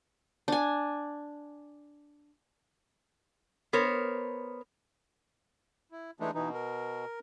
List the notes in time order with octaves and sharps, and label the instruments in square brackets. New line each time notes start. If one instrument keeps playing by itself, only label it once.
[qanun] D4 G#5
[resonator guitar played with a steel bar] B3 A#4 C5 C#5
[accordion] E4
[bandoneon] E3 A3 [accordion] G#3 D4 D#4
[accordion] B2 [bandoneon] E3 D#4
[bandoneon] A#4